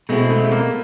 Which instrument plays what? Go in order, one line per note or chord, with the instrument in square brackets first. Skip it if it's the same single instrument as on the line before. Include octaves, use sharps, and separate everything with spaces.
[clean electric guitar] B2 G#3 C4 E4 [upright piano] A3
[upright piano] A3
A3
A#3